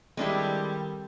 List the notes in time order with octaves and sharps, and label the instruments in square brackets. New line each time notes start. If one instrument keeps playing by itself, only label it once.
[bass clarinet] D#3 [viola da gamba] G3 [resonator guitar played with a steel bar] G#3 D4 E4 [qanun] C4 A4